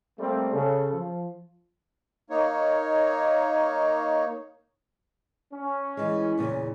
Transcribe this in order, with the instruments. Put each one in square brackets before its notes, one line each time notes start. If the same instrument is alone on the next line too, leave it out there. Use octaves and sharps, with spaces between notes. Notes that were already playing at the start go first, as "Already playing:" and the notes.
[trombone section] G3 A3 A#3 C4
C#3 A4
F3
[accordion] A#3 D#4 C#5
[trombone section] C#4
[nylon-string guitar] E3 G#3
E2 A#2 C#3